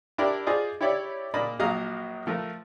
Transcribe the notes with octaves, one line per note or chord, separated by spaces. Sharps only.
D4 E4 G4 A#4 D5
F4 G#4 C5 D5 D#5
E4 G4 C#5 D5 E5
A#2 A#3 D5 D#5 B5
A#1 A#2 F#3 D#5 F5 A#5
F3 A3 A#4